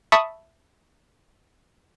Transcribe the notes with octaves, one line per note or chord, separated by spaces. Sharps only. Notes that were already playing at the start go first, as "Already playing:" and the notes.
E5 A5 B5 C#6 D#6